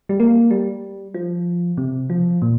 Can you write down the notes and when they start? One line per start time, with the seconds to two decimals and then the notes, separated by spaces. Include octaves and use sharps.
0.09 G3
0.20 A#3
0.51 G3
1.14 F3
1.78 C3
2.10 F3
2.42 A#2